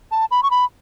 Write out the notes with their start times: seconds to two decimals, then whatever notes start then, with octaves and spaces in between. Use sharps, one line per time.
0.11 A5
0.31 B5
0.43 C#6
0.51 B5